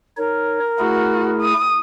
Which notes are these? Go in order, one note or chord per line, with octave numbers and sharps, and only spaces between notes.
D#4 A#4 C#5
A3 E4 F#4 G#4
D#6